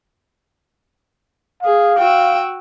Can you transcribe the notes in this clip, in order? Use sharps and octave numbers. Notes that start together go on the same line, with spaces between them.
G#4 F5
F#4 G5 E6